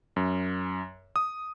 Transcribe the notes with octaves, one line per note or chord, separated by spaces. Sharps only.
F#2
D#6